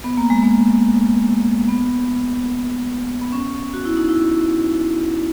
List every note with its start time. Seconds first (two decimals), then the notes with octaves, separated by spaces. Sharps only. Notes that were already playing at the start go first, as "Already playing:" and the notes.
0.04 B3
0.17 A#3
0.30 G#3
0.43 A#3
1.68 B3
3.21 B3
3.32 C#4
3.73 F#4
3.85 E4
3.97 D#4
4.09 E4